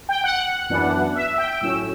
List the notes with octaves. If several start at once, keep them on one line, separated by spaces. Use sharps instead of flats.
G5
F#5
F#2 E3 B3 D4
E5
G5
A2 F#3 C#4 E6